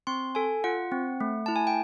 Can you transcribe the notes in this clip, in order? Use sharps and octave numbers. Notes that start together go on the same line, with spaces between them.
C4 C6
A4 G#5
F4 F#5
C4
A3
E4 A5
G#5
G5